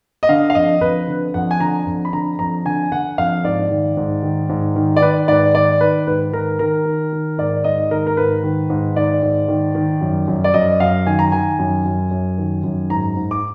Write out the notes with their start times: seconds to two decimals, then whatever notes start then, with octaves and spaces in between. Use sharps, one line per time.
0.23 D#5
0.29 D3 F5
0.50 F5
0.55 F2 D#5
0.81 F2 B4
1.08 D3
1.34 F2 F#5
1.51 G#5
1.60 D3 A#5
1.87 F2
2.05 B5
2.13 D3 A#5
2.39 F2 A#5
2.65 D3 G#5
2.91 D3 F#5
3.18 F2 F5
3.44 G#2 D5
3.71 D#3
3.97 G#2
4.23 D#3
4.49 G#2
4.76 D#3
4.96 D5
5.02 D#3 B4
5.28 G#2 D5
5.54 D#3 D5
5.81 D#3 B4
6.07 G#2 B4
6.33 D#3 A#4
6.59 D#3 A#4
6.85 D#3
7.12 D#3
7.38 G#2 D5
7.64 G#2 D#5
7.91 D#3 A#4
8.07 A#4
8.17 G#2 B4
8.44 D#3
8.70 G#2
8.96 D#3 D5
9.22 G#2
9.48 D#3
9.75 D#3
10.01 F#2
10.28 F#2
10.44 D5
10.54 F#2 D#5
10.80 F#2 F5
11.06 D#3 G#5
11.19 A#5
11.32 D#3 G#5
11.59 F#2
11.85 F#2
12.11 F#2
12.38 D#3
12.64 F#2
12.90 G#2 A#5
13.17 G#2
13.31 D6